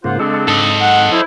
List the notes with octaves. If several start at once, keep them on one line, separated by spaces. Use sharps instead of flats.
G#2 C#3 A#3 F4 C5 F#5
C#3 G#3 C4 D4 A4
G#2 A4 D#5
F#5
E4 C5